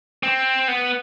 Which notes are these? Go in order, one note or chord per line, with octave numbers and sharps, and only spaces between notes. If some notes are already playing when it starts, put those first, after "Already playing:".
C4
B3